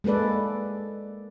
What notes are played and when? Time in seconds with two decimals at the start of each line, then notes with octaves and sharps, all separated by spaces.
0.04 G#3 A#3 A4 B4 D5